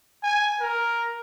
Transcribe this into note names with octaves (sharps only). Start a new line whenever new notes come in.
G#5
A#4